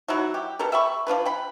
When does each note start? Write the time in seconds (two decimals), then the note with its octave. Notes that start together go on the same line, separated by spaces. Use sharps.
0.08 F#3 D#4 E4 F#4
0.34 G4
0.59 B2 G4 A4 A#4
0.72 E5 G5 B5 C#6
1.07 F3 D4 F4 B4
1.25 G5 B5